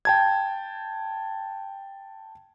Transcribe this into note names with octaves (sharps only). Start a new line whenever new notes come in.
G5 A5 G#6